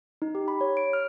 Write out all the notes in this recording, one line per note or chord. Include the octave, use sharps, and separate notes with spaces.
D#4
G4
B5
C#5
D7
F6